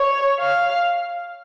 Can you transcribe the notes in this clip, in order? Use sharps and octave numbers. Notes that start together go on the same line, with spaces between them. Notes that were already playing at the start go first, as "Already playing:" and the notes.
Already playing: C#5
F5